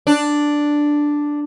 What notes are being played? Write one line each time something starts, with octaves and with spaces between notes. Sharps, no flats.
D4